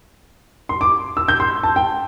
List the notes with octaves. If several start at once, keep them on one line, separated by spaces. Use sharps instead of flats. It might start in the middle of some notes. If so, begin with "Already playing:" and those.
C6
D6
E6
G6
C6
A5
G5